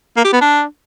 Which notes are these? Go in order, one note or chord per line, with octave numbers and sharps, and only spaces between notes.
A#3
G4
B3
D4